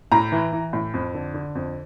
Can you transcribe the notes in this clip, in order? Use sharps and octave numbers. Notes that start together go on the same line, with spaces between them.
A2 A#5
E3
E3
A2
F2
D3
D3
F2